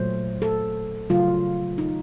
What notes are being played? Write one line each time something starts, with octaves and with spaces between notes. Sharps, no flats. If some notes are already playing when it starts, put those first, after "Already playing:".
Already playing: A#2 F#3 A3 C5
A4
C#3 F#3 A3 F4
D#4